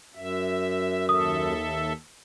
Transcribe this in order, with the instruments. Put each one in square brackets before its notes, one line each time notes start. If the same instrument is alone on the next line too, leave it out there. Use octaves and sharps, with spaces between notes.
[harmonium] F#2 [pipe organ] E5
[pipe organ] D#2 A4 E5 [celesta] D#6